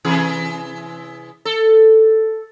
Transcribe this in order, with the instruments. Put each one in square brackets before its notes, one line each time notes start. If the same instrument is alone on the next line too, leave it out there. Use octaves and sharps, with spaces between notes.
[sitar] C3 E3 G#4
A4